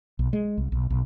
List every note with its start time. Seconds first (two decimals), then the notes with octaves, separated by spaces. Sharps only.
0.19 B1
0.33 G#3
0.58 C2
0.72 B1
0.90 B1